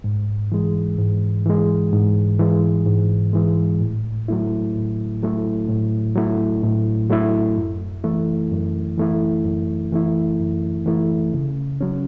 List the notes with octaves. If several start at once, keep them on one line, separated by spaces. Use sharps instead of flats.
G#2
E3 G#3
G#2
E3 G#3
G#2
E3 G#3
G#2
E3 G#3
A2
F#3 A3 E4
A2
F#3 A3 E4
A2
F#3 A3 E4
A2
F#3 A3 E4
F#2
E3 A3 E4
F#2
E3 A3 E4
F#2
E3 A3 E4
F#2
E3 A3 E4
C#3
F#3 C#4